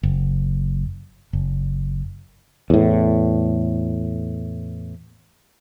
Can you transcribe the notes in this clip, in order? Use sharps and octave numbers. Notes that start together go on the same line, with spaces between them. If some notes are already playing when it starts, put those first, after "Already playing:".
F#1
F#1
E2 A2